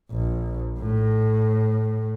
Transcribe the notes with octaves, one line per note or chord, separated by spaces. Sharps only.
A#1
A2